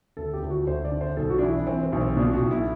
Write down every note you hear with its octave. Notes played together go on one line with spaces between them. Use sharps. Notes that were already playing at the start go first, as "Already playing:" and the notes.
D2 A4
G4
D2
F#4
D2 C5
D5
D3
C5
B1 A4
F#4
D4
E3 E4
D4
E3 C4
C4
B1
C4
B2 D4
F#4
B1
E4